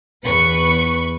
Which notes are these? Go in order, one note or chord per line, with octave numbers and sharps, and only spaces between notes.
E2 B4 C#6 C#7